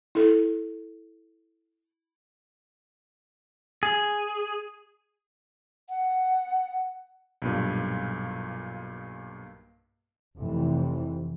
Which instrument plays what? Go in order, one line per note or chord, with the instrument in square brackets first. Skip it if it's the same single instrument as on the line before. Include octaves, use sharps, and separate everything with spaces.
[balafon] E4 A4
[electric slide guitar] G#4
[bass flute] F#5
[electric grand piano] B1 G2 A#2
[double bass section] F1 C3 E3